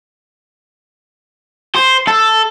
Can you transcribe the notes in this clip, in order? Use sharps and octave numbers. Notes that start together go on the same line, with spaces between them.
C5
A4